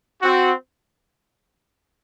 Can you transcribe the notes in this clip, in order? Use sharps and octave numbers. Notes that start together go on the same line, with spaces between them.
C4 F#4